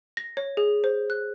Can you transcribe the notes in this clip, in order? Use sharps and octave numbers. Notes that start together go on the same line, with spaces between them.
A#6
C#5
G#4
C5
F#6